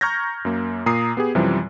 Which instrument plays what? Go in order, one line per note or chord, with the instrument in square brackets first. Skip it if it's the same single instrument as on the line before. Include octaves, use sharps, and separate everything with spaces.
[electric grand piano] A#5 C#6 F6 G6 G#6 A#6
F#2 A#3
A#2 A#5 D#6 C7
B3 G4 G#4
F#2 C3 E3 F3 G3